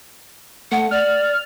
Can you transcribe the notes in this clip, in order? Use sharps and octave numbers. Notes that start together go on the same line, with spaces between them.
A3 F#5
D5 F6